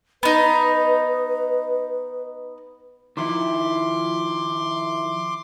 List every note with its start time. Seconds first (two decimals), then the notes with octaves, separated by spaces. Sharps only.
0.23 B3 D#4 B4
3.17 D#3 F3 E4 C6 D6